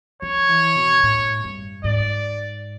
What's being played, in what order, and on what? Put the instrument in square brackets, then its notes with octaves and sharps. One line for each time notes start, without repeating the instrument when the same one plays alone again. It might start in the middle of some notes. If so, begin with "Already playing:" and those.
[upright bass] F3 [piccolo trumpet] C#5
[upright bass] E3
B2
A2
G2
[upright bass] G#2 [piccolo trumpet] D5